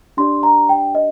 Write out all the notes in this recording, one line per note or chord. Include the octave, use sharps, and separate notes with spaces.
D4 G4 D5 C6
A#5
G5
D#5